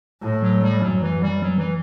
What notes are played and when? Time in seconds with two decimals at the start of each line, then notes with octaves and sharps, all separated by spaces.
0.21 A2
0.42 F#3
0.62 G3
0.82 F#2 F#3
1.02 E3
1.22 G3
1.42 F#3
1.58 E3